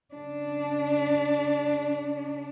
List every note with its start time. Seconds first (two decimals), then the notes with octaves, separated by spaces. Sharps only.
0.15 C#3 D4